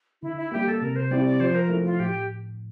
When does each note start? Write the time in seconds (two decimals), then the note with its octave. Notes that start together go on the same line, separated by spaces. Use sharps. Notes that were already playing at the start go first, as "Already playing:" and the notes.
0.22 D3 E4
0.37 E4
0.52 G3 A#3 G4
0.67 A4
0.81 C3 A#4
0.96 C5
1.11 G3 C4 E4 G4 D5
1.26 D5
1.40 F3 C5
1.55 A#4
1.69 A3 E4
1.85 F4
1.99 A2 G4